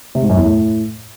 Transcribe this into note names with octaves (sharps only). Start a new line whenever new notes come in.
C3
G#2
F#2
E2
A2